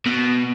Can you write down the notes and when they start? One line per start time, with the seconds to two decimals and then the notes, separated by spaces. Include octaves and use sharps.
0.06 B2